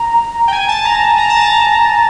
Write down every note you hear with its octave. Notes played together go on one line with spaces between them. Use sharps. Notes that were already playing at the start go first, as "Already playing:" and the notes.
Already playing: A#5
G5
G#5
A5
A#5
A#5
A5
A#5